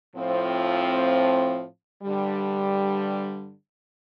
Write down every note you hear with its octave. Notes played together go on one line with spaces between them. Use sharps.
A2 F3 C4 F4
G2 D3 G3